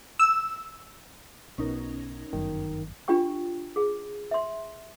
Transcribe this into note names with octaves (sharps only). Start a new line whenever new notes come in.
E6
B1 B2 C#4 D#4 A#4
G1 F#2 D#3
D4 F4 G4 G5 C#6
G#4
E5 C6